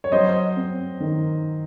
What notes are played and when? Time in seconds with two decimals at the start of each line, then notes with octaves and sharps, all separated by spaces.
0.04 C#5
0.12 F#3 C5 D#5
0.56 C4
1.00 D#3